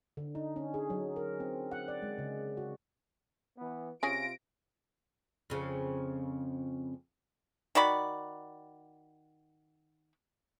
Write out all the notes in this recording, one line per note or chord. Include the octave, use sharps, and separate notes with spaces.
D3
D#4
C#4
G#4
F#3
A#4
C4
F#5
D5
G#3
C#3
F#4
E3 B3
C3 C#4 F4 G#4 A#6 D7
F2 C#3 F3
D#3 F#4 D5 B5